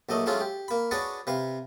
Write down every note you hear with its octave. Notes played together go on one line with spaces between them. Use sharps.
A#1 F#3 A3 D#5
F#3 G#3 A3 C#4 F4 G#4
G4
A#3 B5
D4 F#4 G#4 B4 C#5 D5
C3 B4 F5